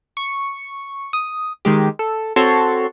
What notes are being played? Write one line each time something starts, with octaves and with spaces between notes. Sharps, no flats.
C#6
D#6
D#3 G#3 G4
A4
C4 F#4 A4 C#5 A5 C6